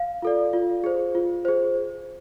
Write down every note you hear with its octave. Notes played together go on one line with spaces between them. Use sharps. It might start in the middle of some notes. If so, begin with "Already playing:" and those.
Already playing: F5
F4 A4 D5
F4
G#4 C5
F4
G#4 C5